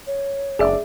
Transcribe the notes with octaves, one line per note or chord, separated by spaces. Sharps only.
C#5
F#1 G#3 D4 G#4 D5 E5